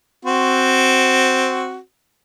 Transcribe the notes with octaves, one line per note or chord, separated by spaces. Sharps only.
C4 F#4